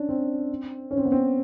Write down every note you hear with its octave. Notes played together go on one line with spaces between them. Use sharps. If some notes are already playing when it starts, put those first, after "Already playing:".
Already playing: C#4 D4
C4
C#4
C4
B3
C4